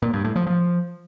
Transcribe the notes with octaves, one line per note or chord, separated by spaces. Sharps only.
A#2
G2
A2
F3
F3